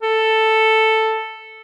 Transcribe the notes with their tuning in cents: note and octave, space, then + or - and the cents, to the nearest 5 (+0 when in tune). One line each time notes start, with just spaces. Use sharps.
A4 +5